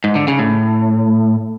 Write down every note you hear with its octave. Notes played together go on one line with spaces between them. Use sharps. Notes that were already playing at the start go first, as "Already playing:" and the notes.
G#2
D3
C#3
A2